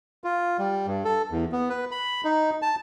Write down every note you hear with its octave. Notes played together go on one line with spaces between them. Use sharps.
F4
G3
G2
A4
E2
B3
B4
B5
D#4
A5